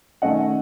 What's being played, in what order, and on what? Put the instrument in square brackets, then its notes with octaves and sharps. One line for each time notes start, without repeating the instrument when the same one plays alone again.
[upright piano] D#3 A3 C#4 D#5 F#5